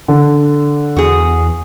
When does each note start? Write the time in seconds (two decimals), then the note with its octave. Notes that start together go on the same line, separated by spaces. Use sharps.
0.08 D3
0.96 E2 F#4 G#4